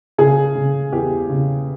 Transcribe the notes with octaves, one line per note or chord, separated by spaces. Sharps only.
C#3 G#4
C#3
E2 G4
C#3